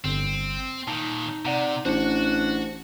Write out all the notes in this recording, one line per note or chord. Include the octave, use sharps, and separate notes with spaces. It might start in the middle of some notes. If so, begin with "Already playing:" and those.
G1 C4
A#2 D#3 D#4 A5
C3 D5 F#5 A#5
A1 D4 F#4 C5 F#5